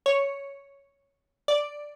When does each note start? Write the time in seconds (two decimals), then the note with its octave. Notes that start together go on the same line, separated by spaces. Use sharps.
0.06 C#5
1.48 D5